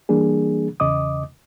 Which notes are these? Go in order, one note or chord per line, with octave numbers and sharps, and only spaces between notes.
E3 G3 A#3 D4 G#4
E2 C#3 D#5 D6 D#6